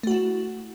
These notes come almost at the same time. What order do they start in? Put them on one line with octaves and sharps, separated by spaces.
A3 F#4 E4